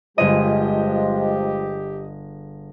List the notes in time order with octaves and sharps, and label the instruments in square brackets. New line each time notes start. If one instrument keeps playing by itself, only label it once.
[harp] G1 G#4 D#7 [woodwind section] F3 G#3 [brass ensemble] G4 [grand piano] D#5